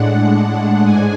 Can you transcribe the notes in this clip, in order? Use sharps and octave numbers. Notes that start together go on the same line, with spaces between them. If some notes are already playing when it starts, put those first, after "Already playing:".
Already playing: A2 G#3 D4 F#5
G#2 G#3 D4 G#5